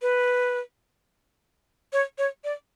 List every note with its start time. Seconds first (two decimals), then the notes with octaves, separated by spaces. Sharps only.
0.02 B4
1.93 C#5
2.18 C#5
2.44 D5